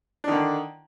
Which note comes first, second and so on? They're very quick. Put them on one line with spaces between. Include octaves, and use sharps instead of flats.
D4 D#3 D3